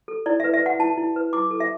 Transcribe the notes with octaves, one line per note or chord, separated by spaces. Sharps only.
A4
E4 D5
B4 E5
E5
B4 F#5
E4 A5
E4
B4
E4 D6
A4
E5